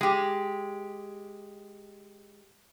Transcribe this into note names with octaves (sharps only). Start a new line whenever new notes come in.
G#3 G4